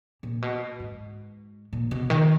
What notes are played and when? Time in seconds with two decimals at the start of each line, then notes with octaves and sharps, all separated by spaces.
0.23 A#2
0.42 B2
0.80 G#2
1.73 A#2
1.91 B2
2.10 D#3